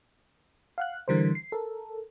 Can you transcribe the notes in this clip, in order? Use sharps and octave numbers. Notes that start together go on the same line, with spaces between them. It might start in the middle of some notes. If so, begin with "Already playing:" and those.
F5 F#5 F#6
D3 E3 G3 A#4 C5
C7
A4 A#4